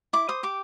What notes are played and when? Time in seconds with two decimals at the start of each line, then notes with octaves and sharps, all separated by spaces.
0.13 E4 D6
0.29 C5 D#6
0.43 G4 D6